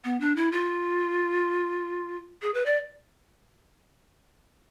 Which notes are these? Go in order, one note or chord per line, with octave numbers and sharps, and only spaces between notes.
B3
D4
E4
F4
G#4
B4
D5